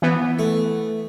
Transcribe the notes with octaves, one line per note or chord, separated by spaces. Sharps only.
E3 B3
A3